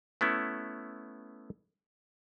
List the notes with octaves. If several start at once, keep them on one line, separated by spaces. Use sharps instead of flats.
A3 B3 C#4 E4